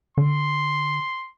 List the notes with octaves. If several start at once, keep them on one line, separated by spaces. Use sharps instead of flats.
D3 C6